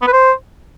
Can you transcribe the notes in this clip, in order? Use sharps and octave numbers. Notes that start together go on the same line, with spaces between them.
B3
B4
C5